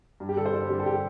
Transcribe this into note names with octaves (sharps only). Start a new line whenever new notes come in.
G2
G4
D3 G3 A4
C5
G2 D5
D3 G3
A4
G4